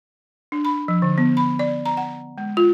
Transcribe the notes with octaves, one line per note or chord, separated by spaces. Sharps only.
D4
B5
F3
D3
B3
B5
D5
A#5
F#5
G#3
F4